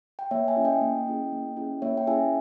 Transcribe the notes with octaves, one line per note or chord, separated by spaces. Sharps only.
G5
A#3 C#5 E5
E5 G#5
C#4 E4 G#4
D#5 G5
A#3
C#4 E4 G#4
A#3
C#4 E4 G#4
A#3 C#5 E5
G5
C#4 E4 G#4 E5 G#5